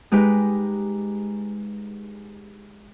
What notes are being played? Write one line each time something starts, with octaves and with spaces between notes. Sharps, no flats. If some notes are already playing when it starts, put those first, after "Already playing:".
G#3 D#4 G4 B4